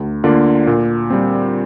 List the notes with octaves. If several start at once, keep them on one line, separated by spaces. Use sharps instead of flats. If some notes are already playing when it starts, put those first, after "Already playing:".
Already playing: D2
D3 A#3 F4 D5
A#2
G3 C4